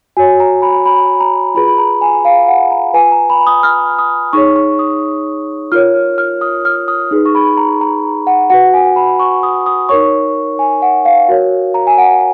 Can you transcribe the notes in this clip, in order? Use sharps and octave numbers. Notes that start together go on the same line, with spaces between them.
F#4 C#5 G#5
A#5
B5
B5
A#5
F4 G#4 B4 B5
B5
A#5
G#5
F5
F#5
A#5
F4 B4 G#5
A#5
B5
D#6
F6
D#6
D#4 G#4 C#5 C#6
C#6
D#6
F4 A#4 C#5 F6
F6
D#6
F6
D#6
D#4 G#4 B4
C#6
B5
A#5
A#5
F#5
F#4 B4 F#5
G#5
B5
C#6
D#6
D#6
D#4 A#4 C#5 C#6
G#5
F#5
F5
F#4 A#4 C#5
A#5
G#5
F#5